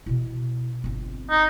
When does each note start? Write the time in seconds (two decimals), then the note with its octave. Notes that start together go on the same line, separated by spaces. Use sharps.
0.06 B2 E4
0.84 G1 C4
1.31 D#4